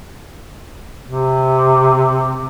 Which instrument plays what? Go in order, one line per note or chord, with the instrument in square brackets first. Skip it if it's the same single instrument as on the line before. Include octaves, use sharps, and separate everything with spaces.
[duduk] C3